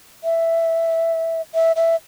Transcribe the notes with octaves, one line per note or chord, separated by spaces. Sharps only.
E5
E5
E5